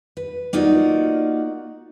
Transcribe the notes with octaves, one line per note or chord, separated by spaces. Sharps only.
B4
A#3 D#4 F4 F#4 D5 F#5